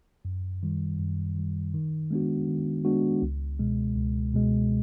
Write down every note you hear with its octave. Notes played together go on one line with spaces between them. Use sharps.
F#2
D#3 G3
F#2
D#3 G3
D#3
G#3 B3 D4 F#4
D#3
G#3 B3 D4 F#4
C#2
B2 G#3
C#2
B2 G#3